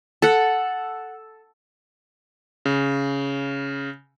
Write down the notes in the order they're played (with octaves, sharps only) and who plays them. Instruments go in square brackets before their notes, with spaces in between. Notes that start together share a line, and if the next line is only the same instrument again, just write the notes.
[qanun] A4 F#5
[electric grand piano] C#3